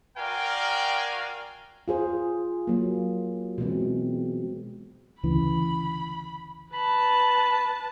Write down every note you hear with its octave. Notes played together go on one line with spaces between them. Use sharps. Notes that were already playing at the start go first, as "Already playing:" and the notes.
F#4 A#4 D5 F5 G5 G#5
F4 G#4 C5
F#3 A#3
B2 E3 G#3 C4
D2 C#3 E3 B5
B4 A5 B5